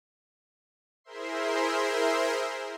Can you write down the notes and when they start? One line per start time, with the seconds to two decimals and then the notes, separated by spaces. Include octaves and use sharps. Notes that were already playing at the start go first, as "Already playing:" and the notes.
1.04 E4 G#4 A#4 C5 E5 C6